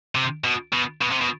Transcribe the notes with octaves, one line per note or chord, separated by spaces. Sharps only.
C3
B2
B2
B2
C3
B2